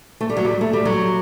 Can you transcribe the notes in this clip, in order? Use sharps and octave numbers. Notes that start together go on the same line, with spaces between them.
A3
G3
F#3
G3
A3
G3
F#3